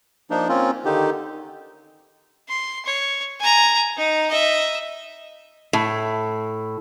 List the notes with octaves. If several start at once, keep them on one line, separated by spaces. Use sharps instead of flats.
F3 A#3 D4 D#4
A#3 C4 C#4 F4
D3 D#3 D#4 G4
C6
C#5
G#5 A#5
D#4
D#5 E5
A2